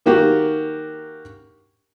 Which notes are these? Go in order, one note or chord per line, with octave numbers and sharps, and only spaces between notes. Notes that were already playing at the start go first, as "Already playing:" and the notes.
D#3 A#3 F#4 G4